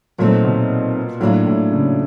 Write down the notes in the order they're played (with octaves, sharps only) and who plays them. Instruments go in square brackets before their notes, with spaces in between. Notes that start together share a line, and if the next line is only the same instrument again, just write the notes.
[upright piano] A#2 [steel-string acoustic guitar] F#3 A3 C4 D#4
[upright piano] B2
[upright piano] A2 [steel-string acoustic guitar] F#3 A#3 D4 F4
[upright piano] A2
C#3